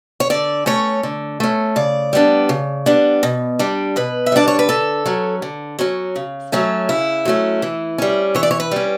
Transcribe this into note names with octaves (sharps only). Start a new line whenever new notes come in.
C#5
D3 D5
A3 C#4 C#5
D3
A3 C#4
C#3 D5
G3 B3 D4
C#3
G3 B3 D4
B2
G3 D4
B2 B4
E5
G3 D4 D5
C#5
B4
D3 A4
F#3 C#4
D3
F#3 C#4
C#3
F#3 A3 C#4
C#3 E4
F#3 A3 C#4
E3
G3 C#4
E3 C#5
D5
C#5
B4
G3 C#4